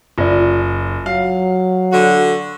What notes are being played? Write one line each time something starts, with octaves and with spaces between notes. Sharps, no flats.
F#1 F4 D5
F#3 F5
D3 F#4